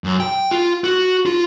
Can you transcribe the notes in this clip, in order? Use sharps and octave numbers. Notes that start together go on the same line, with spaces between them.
F#2
G5
F4
F#4
F4